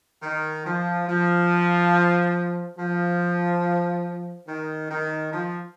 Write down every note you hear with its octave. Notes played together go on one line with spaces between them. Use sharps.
D#3
F3
F3
F3
D#3
D#3
F3